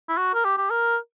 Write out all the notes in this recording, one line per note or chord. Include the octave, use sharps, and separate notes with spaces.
E4
F#4
A#4
G4
G4
A#4